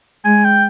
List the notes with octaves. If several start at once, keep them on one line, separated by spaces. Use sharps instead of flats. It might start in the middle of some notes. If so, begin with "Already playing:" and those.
G#3 G#5
G5